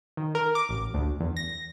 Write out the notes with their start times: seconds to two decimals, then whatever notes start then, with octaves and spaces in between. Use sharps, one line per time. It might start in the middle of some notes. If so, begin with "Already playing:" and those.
0.17 D#3
0.35 A#4
0.55 D6
0.69 A1
0.94 D2
1.21 E2
1.37 A#6